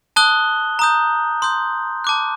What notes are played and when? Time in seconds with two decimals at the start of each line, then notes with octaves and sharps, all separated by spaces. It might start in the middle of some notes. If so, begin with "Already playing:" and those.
0.16 A5 D#6 F#6 G7
0.79 A#5 D#6 G6
1.42 C6 D#6 G6
2.04 A5 D6 F#6